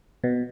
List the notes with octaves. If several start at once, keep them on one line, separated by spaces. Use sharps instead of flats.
B2